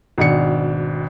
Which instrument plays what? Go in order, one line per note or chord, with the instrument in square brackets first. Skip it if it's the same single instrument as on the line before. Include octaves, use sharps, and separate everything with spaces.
[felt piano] G#1 B2 D4 C#7